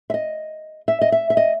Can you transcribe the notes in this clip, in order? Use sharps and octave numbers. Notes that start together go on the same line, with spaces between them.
E5
D#5
E5
D#5
E5
E5
D#5